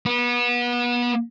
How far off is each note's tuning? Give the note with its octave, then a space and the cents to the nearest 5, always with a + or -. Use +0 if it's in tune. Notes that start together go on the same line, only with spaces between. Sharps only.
B3 -30